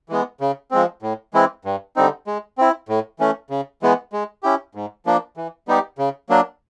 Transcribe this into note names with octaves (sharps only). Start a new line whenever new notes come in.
E3 G#3 B3
C#3
F3 G#3 C4
A2
E3 G#3 C4 E4
G2
D3 G3 C4 D#4
G#3
C4 E4
A2
E3 A3 C#4
C#3
E3 G#3 B3
G#3
C#4 E4 G4
G#2
F3 A#3 D4
E3
G3 B3 D#4 G4
C#3
F#3 A#3 D4